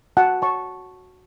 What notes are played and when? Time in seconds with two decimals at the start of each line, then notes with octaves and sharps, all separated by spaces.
0.17 F#4 F#5 A5
0.42 C#5 A5 C#6